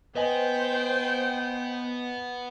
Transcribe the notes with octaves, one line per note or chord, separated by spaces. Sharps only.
B3 B4 C5 D#5 G5 G#5